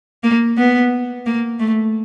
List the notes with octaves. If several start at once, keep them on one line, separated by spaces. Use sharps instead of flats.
A#3
B3
A#3
A3